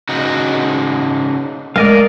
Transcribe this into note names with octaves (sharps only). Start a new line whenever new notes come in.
C#3 D#4 F#4
G#3 A3 A#4 D5 D#5 F5